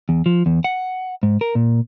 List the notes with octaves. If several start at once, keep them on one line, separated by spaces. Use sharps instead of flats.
E2
F3
E2
F#5
G#2
A#4
A#2